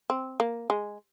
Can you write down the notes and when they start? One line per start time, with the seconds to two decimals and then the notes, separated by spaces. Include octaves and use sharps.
0.10 C4
0.40 A#3
0.70 G#3